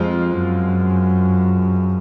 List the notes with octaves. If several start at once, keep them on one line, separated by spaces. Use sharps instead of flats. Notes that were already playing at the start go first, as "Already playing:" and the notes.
Already playing: F2 F3 G#3 C4 F4
F#2